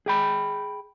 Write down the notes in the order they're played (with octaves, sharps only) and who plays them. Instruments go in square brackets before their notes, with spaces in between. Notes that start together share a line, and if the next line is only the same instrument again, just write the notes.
[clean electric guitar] G#4 G5 B5